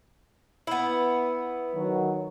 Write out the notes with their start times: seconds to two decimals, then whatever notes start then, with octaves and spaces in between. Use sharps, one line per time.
0.67 B3 E4
1.75 D#3 F#3